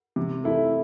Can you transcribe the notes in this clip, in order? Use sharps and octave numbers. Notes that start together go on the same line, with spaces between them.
C3
A3 E4